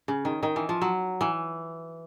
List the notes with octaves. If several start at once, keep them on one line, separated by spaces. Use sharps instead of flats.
C#3
D#3
D#3
E3
F3
F#3
E3